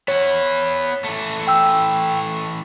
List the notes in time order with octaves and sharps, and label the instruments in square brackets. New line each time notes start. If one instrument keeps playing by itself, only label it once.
[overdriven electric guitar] B3 E4 [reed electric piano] C#5
[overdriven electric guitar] E3 A3
[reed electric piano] G5 E6